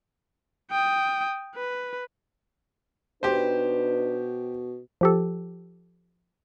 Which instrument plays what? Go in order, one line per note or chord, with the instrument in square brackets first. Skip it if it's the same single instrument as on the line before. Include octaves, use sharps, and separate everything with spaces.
[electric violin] G5 D#6
B4
[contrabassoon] B2 [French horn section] D4 D#4 B4 [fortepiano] G4 C5
[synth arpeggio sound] F3 G4 A4